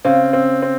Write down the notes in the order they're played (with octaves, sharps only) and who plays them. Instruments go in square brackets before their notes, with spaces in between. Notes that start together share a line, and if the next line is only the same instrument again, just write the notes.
[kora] C#3 [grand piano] C4
[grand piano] C4
C4